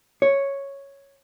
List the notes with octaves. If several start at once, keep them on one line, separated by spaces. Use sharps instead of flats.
C#5